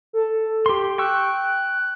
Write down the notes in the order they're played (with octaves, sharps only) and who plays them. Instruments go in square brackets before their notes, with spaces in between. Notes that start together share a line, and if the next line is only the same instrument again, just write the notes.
[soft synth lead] A4
[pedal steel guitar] G4 C6
[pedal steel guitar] G5 C#6 E6 [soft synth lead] F#6